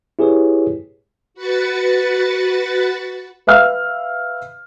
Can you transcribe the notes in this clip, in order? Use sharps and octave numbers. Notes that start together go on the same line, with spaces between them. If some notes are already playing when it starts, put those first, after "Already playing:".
E4 G4 G#4 B4 C#5
F#4 B4 A6 C#7
B4 E5 F5 F6